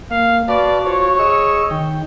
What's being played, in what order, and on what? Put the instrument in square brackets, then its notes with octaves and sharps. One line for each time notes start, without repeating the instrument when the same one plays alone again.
[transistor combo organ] A#3 [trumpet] F5
[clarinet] F#4 [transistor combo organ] B4 F5 A5 [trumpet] D5
[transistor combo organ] F4 C5 [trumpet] C#5
[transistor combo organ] G#4 C#6 E6 [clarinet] D#5
[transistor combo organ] D#3 G5